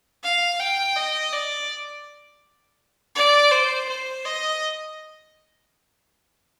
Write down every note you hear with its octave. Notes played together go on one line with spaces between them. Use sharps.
F5
G5
D#5
D5
D5
C5
C5
D#5